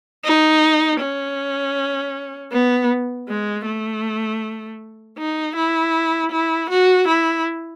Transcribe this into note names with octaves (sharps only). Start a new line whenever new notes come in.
D#4
C#4
B3
G#3
A3
D#4
E4
E4
F#4
E4